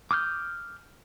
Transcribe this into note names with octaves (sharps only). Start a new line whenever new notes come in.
D6 D#6 F6 G6